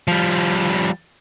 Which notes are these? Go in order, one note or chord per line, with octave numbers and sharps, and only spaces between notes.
F3 G3